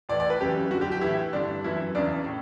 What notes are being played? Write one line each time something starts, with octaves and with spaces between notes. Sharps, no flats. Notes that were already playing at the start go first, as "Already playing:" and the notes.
A2 E3 D5
D5
B4
F#2 C#3 E3 G4
F#2 D3 F#4
G4
G4
A2 E3 E4
G2 D3 D4
F#2 E3 E4
E2 C#3 E3 D4
A2